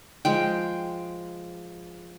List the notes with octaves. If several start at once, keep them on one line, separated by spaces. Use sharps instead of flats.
F3 G#3 G5